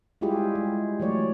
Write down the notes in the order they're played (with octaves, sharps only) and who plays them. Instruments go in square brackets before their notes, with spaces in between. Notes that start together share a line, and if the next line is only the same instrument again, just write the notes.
[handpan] G3 G#3 E4 F4 G4 G#4
G#3
E3 F#3 A3 C#5 D5